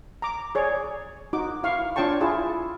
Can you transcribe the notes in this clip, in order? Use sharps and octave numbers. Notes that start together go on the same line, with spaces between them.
A#5 D6
G#4 C#5 D5
D#4 F#4 D6
E4 F5 C#6
D4 F4 C#5 G5 A5 C#6
E4 F4 G#4 A5